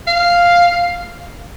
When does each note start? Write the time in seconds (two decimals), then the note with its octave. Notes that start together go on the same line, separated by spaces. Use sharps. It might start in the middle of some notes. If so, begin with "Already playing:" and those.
0.08 F5